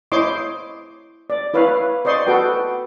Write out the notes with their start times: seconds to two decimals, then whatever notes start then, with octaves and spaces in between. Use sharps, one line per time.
0.12 E4 C5 C#5 D#5 C6 D6
1.30 D5
1.54 E4 B4 C#5 F5
2.05 C5 D5 D#5 C6 C#6
2.26 F#4 A4 B4 G5